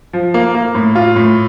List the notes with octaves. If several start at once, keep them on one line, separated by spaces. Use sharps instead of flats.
F3
A#3
A#3
A2
F4
A2